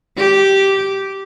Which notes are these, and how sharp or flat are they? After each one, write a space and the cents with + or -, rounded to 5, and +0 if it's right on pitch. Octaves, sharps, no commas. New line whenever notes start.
G4 -10